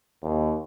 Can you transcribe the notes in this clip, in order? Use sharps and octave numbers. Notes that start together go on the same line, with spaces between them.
D#2